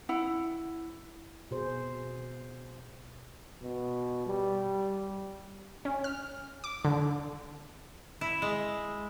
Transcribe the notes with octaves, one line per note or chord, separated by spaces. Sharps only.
E4 F#5
B2 G#4 C5
B2
G3
C#4
F6
D6
D3
E4
G#3